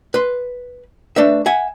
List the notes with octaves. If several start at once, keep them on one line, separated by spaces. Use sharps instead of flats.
B4 C6
A3 D4 B4 E5
E5 F#5 G#5